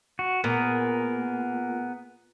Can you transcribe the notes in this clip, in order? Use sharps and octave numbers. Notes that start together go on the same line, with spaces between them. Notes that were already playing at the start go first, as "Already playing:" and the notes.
F#4
A#2 B3 G#4 A#4